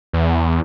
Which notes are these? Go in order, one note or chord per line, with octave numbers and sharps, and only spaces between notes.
E2